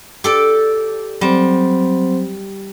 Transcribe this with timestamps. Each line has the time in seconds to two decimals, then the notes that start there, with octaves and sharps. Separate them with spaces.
0.24 G4 A4 D5
1.21 F#3 G3 C4 C5